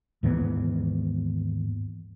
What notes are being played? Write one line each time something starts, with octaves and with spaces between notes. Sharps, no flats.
D#2 G#2 E3 B3